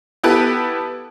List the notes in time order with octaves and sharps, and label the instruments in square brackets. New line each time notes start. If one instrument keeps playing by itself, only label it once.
[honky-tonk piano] B3 E4 G4 A4 B4